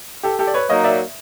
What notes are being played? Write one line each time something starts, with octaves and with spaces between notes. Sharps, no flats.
G4 A4
G4 A4
D5
B4 C#5
F#3 A#3 D#4 C#5 D#5
D5 E5